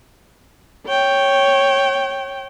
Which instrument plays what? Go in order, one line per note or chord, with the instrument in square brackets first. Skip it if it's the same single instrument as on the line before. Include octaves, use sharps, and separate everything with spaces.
[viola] C#5 G5